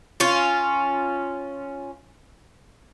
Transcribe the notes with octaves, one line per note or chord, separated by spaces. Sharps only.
C#4 F4